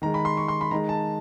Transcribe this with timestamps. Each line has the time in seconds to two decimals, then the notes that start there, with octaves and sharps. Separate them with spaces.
0.02 D#3 G#3 A#5
0.14 B5
0.25 C6
0.37 C#6
0.48 C6
0.61 B5
0.71 D#3 G#3 A#5
0.89 A5